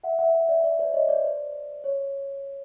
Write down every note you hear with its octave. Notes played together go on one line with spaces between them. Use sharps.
E5 F#5
E5 F#5
D5 E5
D5 E5
C5 D5
C#5 D#5
C5 D5
C5 D5
C#5